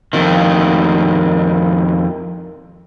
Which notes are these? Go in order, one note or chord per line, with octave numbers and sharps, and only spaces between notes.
F2 D#3